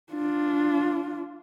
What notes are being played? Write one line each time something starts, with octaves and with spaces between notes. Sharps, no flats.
D4 F4